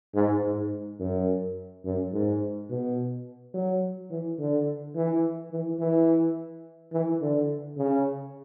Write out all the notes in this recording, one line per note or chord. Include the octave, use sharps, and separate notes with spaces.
G#2
G#2
F#2
F#2
G#2
B2
F#3
E3
D3
E3
E3
E3
E3
D3
C#3